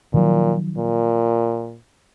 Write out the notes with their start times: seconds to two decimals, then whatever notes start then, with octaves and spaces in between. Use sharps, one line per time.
0.14 A#2 D#3 F3 F#3
0.77 A#2